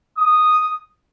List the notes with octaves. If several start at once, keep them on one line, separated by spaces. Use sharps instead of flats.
D#6